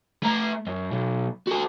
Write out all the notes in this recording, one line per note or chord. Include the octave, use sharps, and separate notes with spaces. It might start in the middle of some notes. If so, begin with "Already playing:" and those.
A3 A#5
F#2
B1
F#4 A4